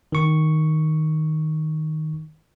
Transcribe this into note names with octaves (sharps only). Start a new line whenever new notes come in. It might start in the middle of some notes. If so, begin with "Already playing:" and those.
D#3 C#6